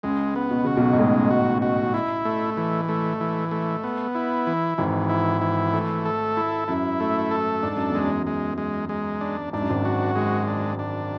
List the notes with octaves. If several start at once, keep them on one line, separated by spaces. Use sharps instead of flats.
C#2 C#3 G#3
B3
B2
C#3 F#4
B1 B2
G#2
A1 A2 G#3
F#4
F#4
E4
A3
E3
A3
E3
A3
B3
E4
E3
G#1 G#2 E3
E4
E3
A3
A4
E4
F#2 E4
A3
A4
G#2 D4
F#2
E2
G#3
F#2
G#3
G#3
G#3
D4
G#2 D4
F#2
G#1 G#2
F#4
G#3
D4
D4